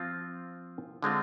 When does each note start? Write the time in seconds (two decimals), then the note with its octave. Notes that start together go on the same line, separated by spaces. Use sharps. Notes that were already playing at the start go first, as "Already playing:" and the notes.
Already playing: F3 C4 F4
1.02 D3 G#3 C4 F4